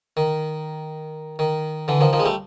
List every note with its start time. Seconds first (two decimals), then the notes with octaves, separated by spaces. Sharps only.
0.17 D#3
1.39 D#3
1.88 D3 E3
2.01 D#3 F3
2.13 D#3 F3
2.20 G#3
2.25 G3 A3